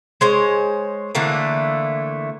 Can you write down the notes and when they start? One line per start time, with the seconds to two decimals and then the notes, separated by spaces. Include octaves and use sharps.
0.21 G#3 C5 C#5
1.15 D3 E3 A3 A#3